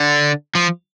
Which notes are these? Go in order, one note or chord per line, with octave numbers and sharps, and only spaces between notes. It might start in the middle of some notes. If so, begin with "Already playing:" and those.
Already playing: D3
F3